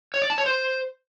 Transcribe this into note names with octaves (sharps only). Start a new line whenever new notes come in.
C#5
D5
A5
C#5
C5